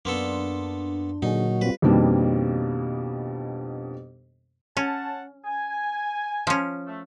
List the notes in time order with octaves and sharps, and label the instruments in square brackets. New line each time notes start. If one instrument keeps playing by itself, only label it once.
[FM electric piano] F#2 C6 [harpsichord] A#3 B3 A4 [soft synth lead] D4
[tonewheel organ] A#2 F#3 [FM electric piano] D3 G#4 [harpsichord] D#4
[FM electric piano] G3 F4 [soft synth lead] C4 [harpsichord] B4
[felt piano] F2 B2 D#3 G3 A#3 D4
[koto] C#4 [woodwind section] C#5 F#5 A5
[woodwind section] G#5
[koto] F3 C#4
[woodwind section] A3